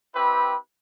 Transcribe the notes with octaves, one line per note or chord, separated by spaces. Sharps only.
C4 E4 G4 B4